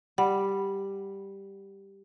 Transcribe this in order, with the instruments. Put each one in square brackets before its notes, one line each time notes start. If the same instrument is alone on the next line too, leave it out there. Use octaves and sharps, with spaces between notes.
[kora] G3 [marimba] F#5